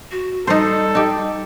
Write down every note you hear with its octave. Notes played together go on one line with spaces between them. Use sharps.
F#4
G3 D#4 A4 C5
D#4 G4